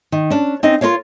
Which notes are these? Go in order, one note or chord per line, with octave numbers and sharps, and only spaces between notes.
D#3
C#4 D4
C4 C#4 D#4 D#5
F4 F#4 A#4 C#5 F5